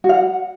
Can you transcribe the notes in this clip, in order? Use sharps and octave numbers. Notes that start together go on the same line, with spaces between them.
F#4
F5
F#5